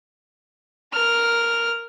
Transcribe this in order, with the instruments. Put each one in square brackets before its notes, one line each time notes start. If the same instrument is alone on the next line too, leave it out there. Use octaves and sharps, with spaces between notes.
[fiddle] A#4 F6